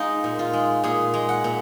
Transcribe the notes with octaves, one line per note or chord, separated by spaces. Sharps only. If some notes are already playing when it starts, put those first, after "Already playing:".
Already playing: G#3 D#4 F4
A#2
F4
G#3
A#2 G#4
G#3
F#5
A#2